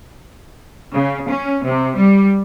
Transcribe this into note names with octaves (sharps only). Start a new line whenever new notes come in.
C#3
C#4
C3
G3